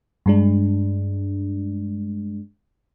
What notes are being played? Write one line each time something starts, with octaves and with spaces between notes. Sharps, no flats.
G2 G#3 D4